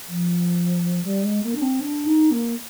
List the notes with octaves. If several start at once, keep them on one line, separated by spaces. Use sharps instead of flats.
F3
G3
G#3
A#3
D4
C4
D4
D#4
A#3